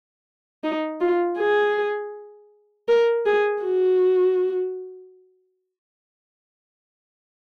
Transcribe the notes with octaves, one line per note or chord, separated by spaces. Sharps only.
D#4
F4
G#4
A#4
G#4
F#4